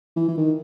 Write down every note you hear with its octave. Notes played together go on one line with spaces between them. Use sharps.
E3
E3
D#3